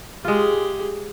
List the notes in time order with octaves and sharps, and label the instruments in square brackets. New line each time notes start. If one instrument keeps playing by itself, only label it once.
[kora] G#3 F4 [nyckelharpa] G4 G#4